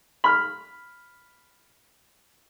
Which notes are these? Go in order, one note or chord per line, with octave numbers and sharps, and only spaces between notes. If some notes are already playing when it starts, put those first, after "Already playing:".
B5 F6